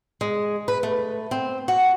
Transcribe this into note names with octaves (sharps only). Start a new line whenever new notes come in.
G#3
B4
A3
C4
F#4